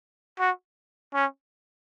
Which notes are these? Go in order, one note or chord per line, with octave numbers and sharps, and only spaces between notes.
F#4
C#4